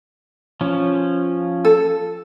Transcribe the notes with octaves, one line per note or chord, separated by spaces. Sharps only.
F3 C#4
A4